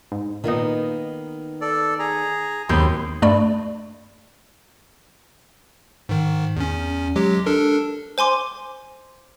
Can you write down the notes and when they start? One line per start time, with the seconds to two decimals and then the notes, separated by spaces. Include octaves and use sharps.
0.12 G#2
0.44 A#2 D#3 A#3 B3 D#4
1.61 A4 D5
1.99 G#4 A#5
2.69 D#2 C3 F#3 G#3 B3 C6 G6
3.22 G2 A3 D5 B5
6.09 G#2 D#3
6.56 E2 C#4
7.16 F#3 G#3 G4
7.46 D4 A4 A#4
8.18 C5 G#5 C6 D6